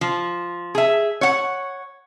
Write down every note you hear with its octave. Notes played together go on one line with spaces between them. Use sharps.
F3
G#4 E5
C#5 F#5